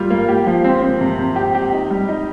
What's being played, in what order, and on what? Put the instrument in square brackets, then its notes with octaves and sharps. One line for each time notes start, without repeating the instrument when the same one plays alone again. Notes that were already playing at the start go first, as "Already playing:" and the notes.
Already playing: [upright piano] G3 A#3 F4
A#3
G4
F3
C4
C4
C3
C3
G4
G4
D#4
G3
D#4